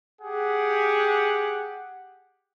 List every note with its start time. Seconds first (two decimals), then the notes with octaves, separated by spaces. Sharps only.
0.21 G4 G#4 F#5